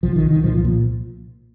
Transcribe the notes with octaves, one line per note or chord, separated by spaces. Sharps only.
C2 F3
D#3
C2
D#3
A#2 F3
F3
A#2